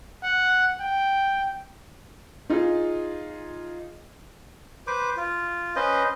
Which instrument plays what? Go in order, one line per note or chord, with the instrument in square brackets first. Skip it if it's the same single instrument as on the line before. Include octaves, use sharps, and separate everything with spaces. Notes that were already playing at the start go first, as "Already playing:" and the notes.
[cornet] F#5
G5
[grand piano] D#4 F4 G#4
[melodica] B4 C5 D6
F4
C#4 B4 C5 D#5